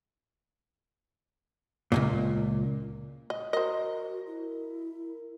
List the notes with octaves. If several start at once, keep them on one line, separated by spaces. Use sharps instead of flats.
C#2 F#2 A#2
D#5
F#4 A#4 C5 D#5
E4